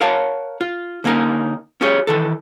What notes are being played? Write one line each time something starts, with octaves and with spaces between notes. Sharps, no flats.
A#4 C#5 F5 F#5 A5
F4
D3 A#3 C#4 D#4 A#4
C#4 F4 G4 G#4 C#5
D#3 E3 A4